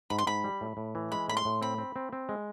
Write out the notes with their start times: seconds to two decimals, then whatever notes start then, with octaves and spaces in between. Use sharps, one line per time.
0.10 G#2 B5
0.18 C6
0.27 G#2 B5
0.44 G3
0.61 A2
0.77 A2
0.95 E3
1.11 G#3 B5
1.28 A2 B5
1.37 C6
1.45 A2
1.61 C4 B5
1.78 C4
1.96 C4
2.13 C4
2.29 G#3